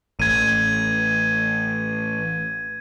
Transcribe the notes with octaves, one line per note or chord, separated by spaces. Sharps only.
A1 G#6 D#7